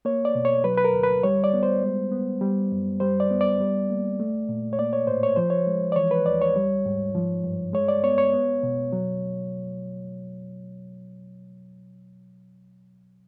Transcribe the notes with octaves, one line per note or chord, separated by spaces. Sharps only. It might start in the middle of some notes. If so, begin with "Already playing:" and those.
A#3 C#5
D5
B2
C#5
F#3 B4
B4
A#4
D2
B4
G3 C#5
D5
B3
C5
G#3
B3
G3
F#2
G3 C5
D5
B3
D5
G3
A#3
A3
A#2
C#5
A#3 D5
C#5
A2 C5
C#5
F3 C5
C#5
G#3
D5
E3 C#5
B4
D#2 D5
C#5
G3
G#2
F3
G2
G#3 C#5
D5
B3 C#5
C#5
B3
B2
F#3